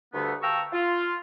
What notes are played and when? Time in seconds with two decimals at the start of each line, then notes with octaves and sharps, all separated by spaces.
0.14 D2 G2 D3 A3 B3
0.42 F5 G5 A5 A#5 C#6 E6
0.72 F4